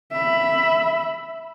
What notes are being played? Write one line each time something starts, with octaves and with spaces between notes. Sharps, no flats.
E5 B5